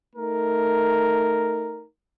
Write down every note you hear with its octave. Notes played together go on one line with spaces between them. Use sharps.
A3 D#4 A#4